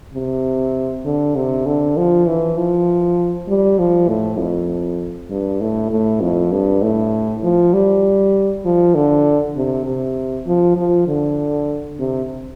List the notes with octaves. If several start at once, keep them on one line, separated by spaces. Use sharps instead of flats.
C3
D3
C3
D3
F3
E3
F3
G3
F3
A2
F2
G2
A2
A2
F2
G2
A2
F3
G3
F3
D3
C3
C3
F3
F3
D3
C3